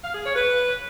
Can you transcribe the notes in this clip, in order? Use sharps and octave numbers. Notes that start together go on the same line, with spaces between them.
F5
G#4
C#5
B4